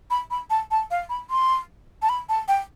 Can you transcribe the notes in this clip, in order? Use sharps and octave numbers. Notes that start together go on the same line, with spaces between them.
B5
B5
A5
A5
F5
B5
C6
A5
B5
A5
G5